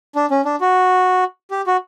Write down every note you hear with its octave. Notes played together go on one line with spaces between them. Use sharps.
D4
C#4
D4
F#4
G4
F#4